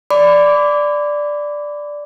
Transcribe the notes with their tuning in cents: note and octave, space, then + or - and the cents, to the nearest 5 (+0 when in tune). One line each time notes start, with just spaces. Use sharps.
D5 +0 B5 +30 D6 -15